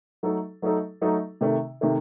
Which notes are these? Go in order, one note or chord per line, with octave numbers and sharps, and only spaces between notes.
F#3 A3 D#4 A4
F#3 A3 D#4 A4
F#3 A3 D#4 A4
C3 D#3 A3
C3 D#3 A3